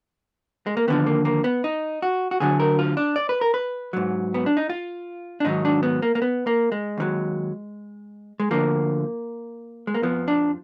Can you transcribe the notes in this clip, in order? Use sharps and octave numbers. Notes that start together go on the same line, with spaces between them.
G#3
A#3
D#2 D3 F3 B3
A#3
A#3
B3
D#4
F#4
F#4
D2 D3 F#3 G#4
A#4
F4
D4
D5
B4
A#4
B4
G#2 F#3
B3
D4
D#4
F4
D4
G#2 D#3 F#3 D#4
D4
B3
A#3
A#3
B3
A#3
G#3
D#2 D#3 F#3
G#3
D2 D3 F3 A#3
G#3
A#3
F2 F3 B3
D4